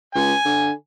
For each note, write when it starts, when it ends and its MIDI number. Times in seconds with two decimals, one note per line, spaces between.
0.15 0.34 37
0.15 0.70 80
0.45 0.71 50